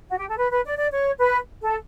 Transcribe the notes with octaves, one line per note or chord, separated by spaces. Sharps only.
F#4
G4
A4
B4
B4
D5
D5
C#5
B4
A4